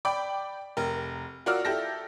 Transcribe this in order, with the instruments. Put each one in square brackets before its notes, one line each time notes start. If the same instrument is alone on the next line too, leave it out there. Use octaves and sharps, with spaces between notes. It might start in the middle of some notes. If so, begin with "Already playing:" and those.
[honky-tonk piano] D5 G5 B5 D6
F1 A#4
F4 F#4 A#4 D5 E6 F6
E4 G4 A4 A#6